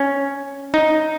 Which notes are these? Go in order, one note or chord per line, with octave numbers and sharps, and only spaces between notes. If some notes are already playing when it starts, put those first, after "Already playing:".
Already playing: C#4
D#4